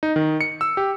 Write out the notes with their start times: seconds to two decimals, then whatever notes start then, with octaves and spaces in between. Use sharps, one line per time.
0.03 D#4
0.16 D#3
0.41 C#7
0.61 E6
0.77 G4